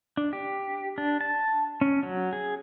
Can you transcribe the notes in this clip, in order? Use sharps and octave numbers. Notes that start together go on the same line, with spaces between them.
D4
G4
D4
A5
C#4
F#3
G#4